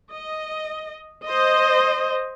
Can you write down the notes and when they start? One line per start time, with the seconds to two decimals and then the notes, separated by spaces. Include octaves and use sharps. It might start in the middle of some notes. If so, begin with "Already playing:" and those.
0.11 D#5
1.25 C5 D#5